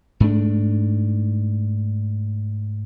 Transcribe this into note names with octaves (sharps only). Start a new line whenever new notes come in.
G#2 A3 D4